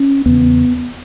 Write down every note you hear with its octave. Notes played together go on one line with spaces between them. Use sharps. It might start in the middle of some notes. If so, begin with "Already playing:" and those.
Already playing: C#4
E2 C#3 B3